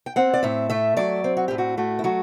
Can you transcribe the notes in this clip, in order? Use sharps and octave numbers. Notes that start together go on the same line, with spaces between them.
G5
C4 F#5
D5
A2 E5
A3 E5
F#3 D5
C4
F#4
A2 G4
F#4
A3 F#4
E4
F#3 F#4